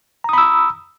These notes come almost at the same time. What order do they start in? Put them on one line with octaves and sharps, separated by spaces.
A#5 D#6 B5 E6